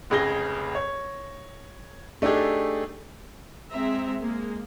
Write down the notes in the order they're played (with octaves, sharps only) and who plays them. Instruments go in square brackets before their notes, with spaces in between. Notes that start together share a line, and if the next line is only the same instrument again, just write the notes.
[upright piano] F1 C#2 C#3 G#4 A#6 G7
C#5
A3 D4 D#4 G4 G#4
[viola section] G#3 C4 E5 A#5
G#3 A#3